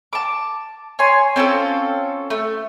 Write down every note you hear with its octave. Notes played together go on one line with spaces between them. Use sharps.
A5 D6
C#5 G#5 C6
C4 C#4 F4 A4
A3